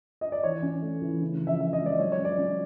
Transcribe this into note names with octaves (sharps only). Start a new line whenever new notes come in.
D#5
D5
E3 C#5
C#4
A3
E3
C#3
F3
E5
F3 E5
D#5
G#3
D5
F#3 C#5
C#5
C#4
D5
C#4